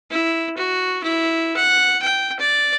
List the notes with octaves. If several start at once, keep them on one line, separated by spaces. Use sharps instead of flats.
E4
F#4
E4
F#5
G5
D5